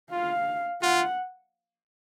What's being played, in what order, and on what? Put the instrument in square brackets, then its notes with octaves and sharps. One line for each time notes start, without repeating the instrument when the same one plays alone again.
[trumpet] F4 [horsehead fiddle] F5
[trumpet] F4 [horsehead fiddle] F#5